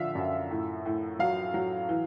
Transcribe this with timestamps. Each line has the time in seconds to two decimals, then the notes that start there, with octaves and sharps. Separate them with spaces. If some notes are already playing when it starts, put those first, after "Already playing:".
Already playing: D3 F3 E5 F5
0.15 F#2
0.51 A2
0.85 A2
1.19 F#3 F5
1.54 F#3
1.89 E3